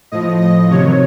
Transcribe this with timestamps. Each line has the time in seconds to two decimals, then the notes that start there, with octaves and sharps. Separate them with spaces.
0.12 A2 F3 D#5
0.41 D#5
0.71 C3 D#3 F#3 C#5